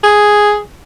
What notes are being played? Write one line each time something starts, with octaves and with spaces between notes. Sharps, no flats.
G#4